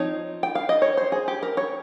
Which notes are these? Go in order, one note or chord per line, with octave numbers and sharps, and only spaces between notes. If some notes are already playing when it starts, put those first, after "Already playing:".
Already playing: F3 C4 D#4 C#5
G5
F5
D#5
C#5
C5
G#4
G4
A#4
C#5